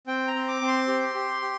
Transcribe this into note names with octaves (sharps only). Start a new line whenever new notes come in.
C4 G5
A#5
C4
D6
C4
C6
G4
G4
G4